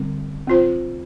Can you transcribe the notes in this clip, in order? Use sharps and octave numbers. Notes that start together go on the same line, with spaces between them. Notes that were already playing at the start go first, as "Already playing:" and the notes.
Already playing: D3 G3 C4
C4 F4 C5